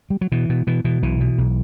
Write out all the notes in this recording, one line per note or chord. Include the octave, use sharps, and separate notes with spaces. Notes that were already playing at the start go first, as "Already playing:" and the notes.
G3
F#3
B2 E3
B2
B2 E3
B2 E3
B1 E3
B2
B1